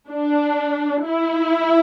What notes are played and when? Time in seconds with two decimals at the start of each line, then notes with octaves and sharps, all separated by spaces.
0.11 D4
1.05 E4